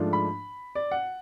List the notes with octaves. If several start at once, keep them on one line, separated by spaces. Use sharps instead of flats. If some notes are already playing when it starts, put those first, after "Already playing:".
Already playing: G#2 F3 A3 D4 F4
B5
D5
F#5